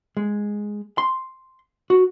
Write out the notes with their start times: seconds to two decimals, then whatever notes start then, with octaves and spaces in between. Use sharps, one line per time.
0.17 G#3
0.98 C6
1.90 F#4